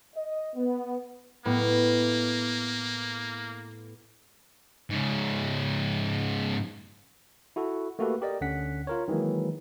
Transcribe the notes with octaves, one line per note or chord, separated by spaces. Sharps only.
D#5
B3
A2 A#3 B3
G#2 C#3
E4 F#4 A4
A3 A#3 F#4 G4 A4 B4
G4 A#4 D5 D#5
D2 D3 C#4 F#5 B6
F4 A#4 C#5
D#3 E3 F#3 G#3 A#3